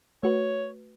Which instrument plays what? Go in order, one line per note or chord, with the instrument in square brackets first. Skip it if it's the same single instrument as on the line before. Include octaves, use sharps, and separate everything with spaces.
[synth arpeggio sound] A3 F#4 B4 [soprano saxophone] C#5